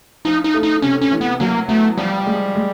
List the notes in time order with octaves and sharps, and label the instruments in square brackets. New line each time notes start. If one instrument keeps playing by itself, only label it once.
[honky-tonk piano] F3 [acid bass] D#4
[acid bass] D#4
[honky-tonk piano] A3
[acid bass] D#4
[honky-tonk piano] C3 [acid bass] C#4
[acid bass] C#4
[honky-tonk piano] E3
[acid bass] B3
[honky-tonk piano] F#3 [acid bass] A#3
[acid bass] A3 [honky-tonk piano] B3
[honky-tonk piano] F3 [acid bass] G3
[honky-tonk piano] G#3
G#3